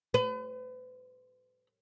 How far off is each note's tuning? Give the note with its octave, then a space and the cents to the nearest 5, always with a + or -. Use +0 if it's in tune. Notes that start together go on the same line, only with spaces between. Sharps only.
B4 +40